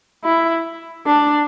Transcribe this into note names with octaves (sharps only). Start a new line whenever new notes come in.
E4
D4